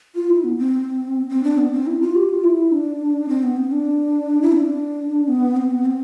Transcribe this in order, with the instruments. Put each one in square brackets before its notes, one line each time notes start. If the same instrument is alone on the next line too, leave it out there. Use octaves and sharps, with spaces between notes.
[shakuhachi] F4
E4
B3
C4
C4
D4
B3
C4
E4
F4
G4
F4
E4
D4
C4
B3
C4
D4
E4
C4
D4
B3
C4
B3
C4